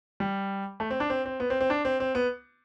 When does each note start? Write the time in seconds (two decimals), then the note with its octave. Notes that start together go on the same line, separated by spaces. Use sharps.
0.20 G3
0.80 A3
0.90 C4
1.00 D4
1.10 C4
1.26 C4
1.40 B3
1.50 C4
1.60 C4
1.70 D4
1.85 C4
2.00 C4
2.15 B3